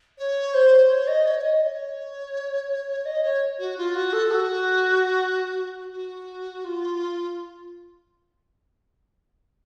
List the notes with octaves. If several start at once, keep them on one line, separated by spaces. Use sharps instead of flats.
C#5
C5
C#5
D#5
C#5
C#5
D#5
C#5
D#5
C#5
F#4
F4
F#4
A4
F#4
F#4
F4